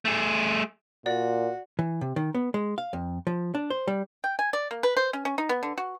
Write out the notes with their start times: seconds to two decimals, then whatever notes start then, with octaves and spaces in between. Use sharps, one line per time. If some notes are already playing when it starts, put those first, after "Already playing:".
0.05 A3 G#4
1.06 A#2 F#4 D5
1.79 E3
2.01 C3
2.16 D#3
2.35 B3
2.54 G#3
2.78 F5
2.93 F2
3.27 F3
3.55 D4
3.70 C5
3.87 G3
4.24 G5
4.39 G#5
4.53 D5
4.71 A#3
4.83 B4
4.97 C5
5.13 C#4
5.25 C#4
5.38 D#4
5.49 B3
5.63 D3
5.78 F#4